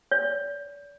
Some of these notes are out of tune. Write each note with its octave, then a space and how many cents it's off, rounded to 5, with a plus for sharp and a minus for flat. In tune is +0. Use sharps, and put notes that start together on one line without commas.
D5 -40